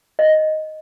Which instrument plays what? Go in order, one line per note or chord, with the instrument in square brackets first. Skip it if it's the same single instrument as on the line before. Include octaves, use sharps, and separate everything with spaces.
[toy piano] D#5